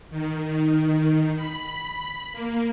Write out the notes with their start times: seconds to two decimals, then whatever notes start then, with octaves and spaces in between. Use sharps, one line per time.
0.11 D#3
1.36 B5
2.33 A#3